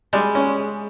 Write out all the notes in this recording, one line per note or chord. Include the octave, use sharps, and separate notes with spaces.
G3 G#3
C#4